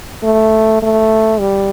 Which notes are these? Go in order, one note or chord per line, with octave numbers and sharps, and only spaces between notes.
A3
A3
G3